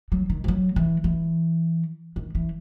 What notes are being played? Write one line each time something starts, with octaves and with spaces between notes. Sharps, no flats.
F#3
D#3
E3
F#3
E3
E3
D#3
E3